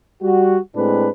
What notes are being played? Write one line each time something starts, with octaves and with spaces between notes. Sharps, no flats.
G3 F#4
A2 G#3 C4 D4 B4